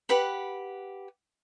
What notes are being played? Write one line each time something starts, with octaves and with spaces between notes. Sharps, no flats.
G4 B4 F#5 B5